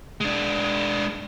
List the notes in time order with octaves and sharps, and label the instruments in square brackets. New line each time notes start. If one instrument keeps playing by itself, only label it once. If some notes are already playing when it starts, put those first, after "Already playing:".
[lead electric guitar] G#3 D4